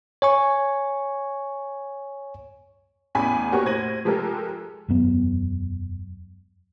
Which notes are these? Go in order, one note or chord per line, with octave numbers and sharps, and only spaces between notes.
C#5 G#5 C#6
A1 E2 C#4 G#5 B5 B6
A#3 F#4 G4 A#4 C#5 C#6
A2 C5 G#6 A#6 D#7 F#7
F3 G#3 G4 A4 A#4
E1 F#2 B3